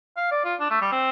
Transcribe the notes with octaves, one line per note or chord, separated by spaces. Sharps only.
F5
D5
F4
D4
A3
G3
C4